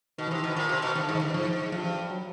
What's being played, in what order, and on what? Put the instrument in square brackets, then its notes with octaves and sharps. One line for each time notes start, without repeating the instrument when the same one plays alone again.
[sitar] B2 [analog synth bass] D#3
[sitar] C3 [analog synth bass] E3
[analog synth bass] D#3
[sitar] B2
[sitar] A#2 [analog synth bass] D#3
[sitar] C3
B2
[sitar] G2 [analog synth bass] D#3
[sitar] G#2
[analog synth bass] D#3
[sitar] G2
[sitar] G#2 [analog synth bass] F3
[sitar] G#2
[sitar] G2 [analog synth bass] F3
[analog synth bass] F#3